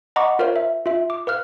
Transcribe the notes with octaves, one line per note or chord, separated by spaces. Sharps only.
D#5 F#5 A#5 B5 C#6 D6
F4 A#4 C5 C#5 F5
E5
F4 E5
D6
B4 F5 F6 F#6